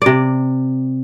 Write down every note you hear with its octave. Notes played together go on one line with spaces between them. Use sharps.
C3 D5